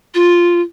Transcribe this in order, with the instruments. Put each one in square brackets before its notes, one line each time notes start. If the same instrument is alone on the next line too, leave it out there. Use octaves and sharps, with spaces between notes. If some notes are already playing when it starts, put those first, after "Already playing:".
[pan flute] F4